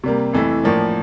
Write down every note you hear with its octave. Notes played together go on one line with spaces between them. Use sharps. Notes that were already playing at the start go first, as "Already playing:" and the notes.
C3 G3 A#3
F2 E3 A3 E4
A2 F3 A#3 D4